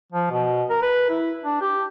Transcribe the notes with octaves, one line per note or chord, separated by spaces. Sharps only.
F3
B2
A#4
B4
E4
D4
G4